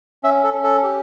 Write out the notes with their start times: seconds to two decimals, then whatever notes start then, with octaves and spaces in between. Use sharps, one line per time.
0.23 C#4 E5
0.44 A4
0.54 C#4
0.64 A4
0.83 G4